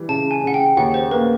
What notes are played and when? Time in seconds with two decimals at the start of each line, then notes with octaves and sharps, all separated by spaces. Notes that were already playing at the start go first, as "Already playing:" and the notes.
Already playing: E3 G3
0.09 C#3 A5
0.31 G#5
0.43 C#3 F#5
0.54 G5
0.77 D#2 F#5
0.94 C5
1.11 A#3 B4